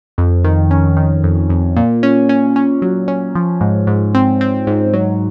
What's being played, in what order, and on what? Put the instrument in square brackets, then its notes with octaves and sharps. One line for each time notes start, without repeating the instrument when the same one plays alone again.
[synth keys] F2
D#3
C#4
D#3
F2
F2
A#2
C#4
C#4
C#4
F#3
C#4
F3
G#2
G#2
C4
C4
G#2
F#3